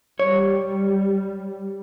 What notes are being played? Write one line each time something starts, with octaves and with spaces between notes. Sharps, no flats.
G3 C#5